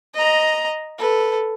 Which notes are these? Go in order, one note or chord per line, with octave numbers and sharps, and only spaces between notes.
D#5 A#5
A4 B4